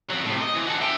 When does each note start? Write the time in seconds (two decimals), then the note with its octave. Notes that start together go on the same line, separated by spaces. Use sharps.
0.10 F2 F#3
0.25 A2 C3
0.41 D#5
0.55 E3
0.67 F#4 A4
0.81 E5 G5